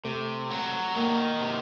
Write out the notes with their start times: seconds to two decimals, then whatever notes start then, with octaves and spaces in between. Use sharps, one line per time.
0.04 C3 A3
0.51 F#3
0.95 D#3 A#3
1.41 C3